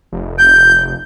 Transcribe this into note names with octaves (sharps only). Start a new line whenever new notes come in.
F1
G6